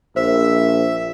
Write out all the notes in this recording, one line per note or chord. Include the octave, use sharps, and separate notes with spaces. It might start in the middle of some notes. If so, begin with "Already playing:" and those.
A#1 C5 E5